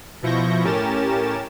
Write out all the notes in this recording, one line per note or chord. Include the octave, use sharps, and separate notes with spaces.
B2 F3 E4 C#6 G6 A#6
A2 C#4 G4 A#4 A6 E7